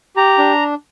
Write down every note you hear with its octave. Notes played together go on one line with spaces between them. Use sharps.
G4 A#5
D4